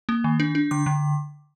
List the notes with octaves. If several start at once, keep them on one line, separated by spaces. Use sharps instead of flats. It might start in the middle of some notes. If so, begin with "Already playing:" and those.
A#3
D#3
D4
D4
D3 D6
D3